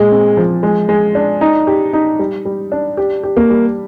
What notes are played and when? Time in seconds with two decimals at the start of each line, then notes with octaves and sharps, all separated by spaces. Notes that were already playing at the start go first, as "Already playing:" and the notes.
Already playing: A#2 G#3
0.11 C4
0.37 F3
0.63 G#3
0.89 G#3
1.15 D4
1.41 D#4
1.67 G4
1.93 D#4
2.19 G3
2.45 G3
2.72 D4
2.97 G4
3.24 G4
3.37 A#3
3.50 G3